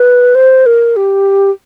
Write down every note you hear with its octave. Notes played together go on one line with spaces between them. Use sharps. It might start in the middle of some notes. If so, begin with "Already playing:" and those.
Already playing: B4
C5
A#4
G4